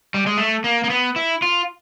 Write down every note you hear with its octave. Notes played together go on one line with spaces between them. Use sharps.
G3
G#3
A3
A#3
A#3
B3
E4
F4